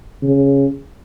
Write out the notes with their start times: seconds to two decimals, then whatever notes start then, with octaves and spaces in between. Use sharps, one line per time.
0.22 C#3